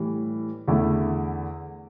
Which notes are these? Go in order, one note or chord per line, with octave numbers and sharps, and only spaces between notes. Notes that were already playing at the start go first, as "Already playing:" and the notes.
Already playing: A2 E3 G3
E2 D3 A3 E4